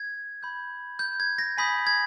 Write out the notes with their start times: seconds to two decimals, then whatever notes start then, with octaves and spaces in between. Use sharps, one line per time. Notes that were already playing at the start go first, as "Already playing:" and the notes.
Already playing: G#6
0.43 B5 G6
0.99 G6
1.20 G#6
1.38 A#6
1.58 G#5 B5 D#6 G6 B6
1.87 G#6